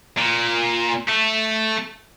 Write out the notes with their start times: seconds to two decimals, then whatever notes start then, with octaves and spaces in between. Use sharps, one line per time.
0.17 A#2
1.08 A3